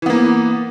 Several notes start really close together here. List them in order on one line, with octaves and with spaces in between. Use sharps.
E3 B3 A#3